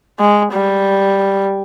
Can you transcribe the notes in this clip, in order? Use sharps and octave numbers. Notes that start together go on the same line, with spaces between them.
G#3
G3